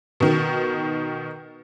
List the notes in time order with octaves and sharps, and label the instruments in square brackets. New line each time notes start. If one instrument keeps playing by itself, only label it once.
[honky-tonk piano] B2 D#3